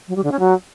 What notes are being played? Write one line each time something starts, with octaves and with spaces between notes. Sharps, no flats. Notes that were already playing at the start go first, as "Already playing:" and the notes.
F#3
G3
D3
C#4
F#3